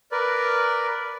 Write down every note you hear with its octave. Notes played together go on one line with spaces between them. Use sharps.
A#4 B4 D5